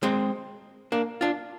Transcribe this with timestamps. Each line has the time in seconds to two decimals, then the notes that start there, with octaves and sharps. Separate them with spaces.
0.03 G#3 C4
0.92 A#3 D4
1.21 D4 F4